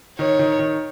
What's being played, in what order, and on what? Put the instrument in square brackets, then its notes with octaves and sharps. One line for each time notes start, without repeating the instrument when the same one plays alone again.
[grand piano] D#3 [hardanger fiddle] C#5
[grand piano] D#3
D#3